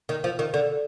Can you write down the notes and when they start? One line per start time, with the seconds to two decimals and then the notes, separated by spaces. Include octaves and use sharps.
0.09 D#3
0.24 F3
0.39 D#3
0.54 D3